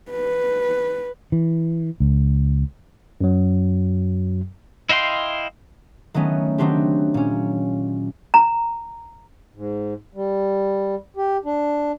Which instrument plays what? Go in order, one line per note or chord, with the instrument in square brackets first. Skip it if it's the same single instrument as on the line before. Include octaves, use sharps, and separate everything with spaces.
[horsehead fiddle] B4
[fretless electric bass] E3
C#2
[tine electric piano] F#2 F#3
[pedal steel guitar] E4 D#5 F5 G5 C6
[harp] D#3 F#3 A3 B3 C#4
D#3 F#3 A3 C4 D4 G4
A#2 C#4
[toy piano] A#5
[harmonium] G#2
G3
G4
D4